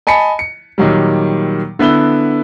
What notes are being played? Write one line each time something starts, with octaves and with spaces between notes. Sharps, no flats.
D#5 G#5 A5 B5 C#7
C#7
A#2 D#3 F#3 G3
D3 B3 E4 E6 G7